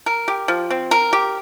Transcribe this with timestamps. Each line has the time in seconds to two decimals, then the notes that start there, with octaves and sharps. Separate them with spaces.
0.06 A#4
0.28 G4
0.48 F3
0.70 C4
0.91 A#4
1.13 G4